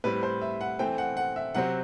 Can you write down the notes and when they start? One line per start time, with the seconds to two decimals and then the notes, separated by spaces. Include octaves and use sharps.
0.04 A2 G3 C4 B4
0.23 C5
0.41 E5
0.61 F#5
0.79 E3 A3 C4 G5
0.98 F#5
1.17 F#5
1.36 E5
1.55 C3 F#3 C4 F#5